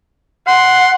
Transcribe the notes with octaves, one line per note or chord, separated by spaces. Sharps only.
F#5 C6